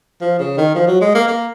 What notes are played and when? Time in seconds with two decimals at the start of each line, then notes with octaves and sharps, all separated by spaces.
0.21 F3
0.39 C#3
0.57 D#3
0.75 F3
0.88 F#3
1.01 G#3
1.15 A#3
1.28 A#3